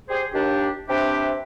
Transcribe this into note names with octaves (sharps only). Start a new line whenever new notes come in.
G4 G#4 C5
D#2 D4 G4
C3 C4 D4 G4 B4 E5